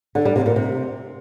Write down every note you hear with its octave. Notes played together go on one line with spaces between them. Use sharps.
D3
G3
C3
A#2
C3